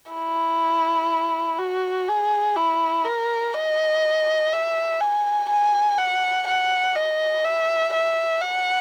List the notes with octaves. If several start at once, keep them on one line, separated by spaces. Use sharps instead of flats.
E4
F#4
G#4
E4
A#4
D#5
E5
G#5
G#5
F#5
F#5
D#5
E5
E5
F#5